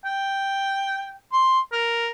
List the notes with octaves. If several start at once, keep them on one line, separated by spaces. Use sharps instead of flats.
G5
C6
A#4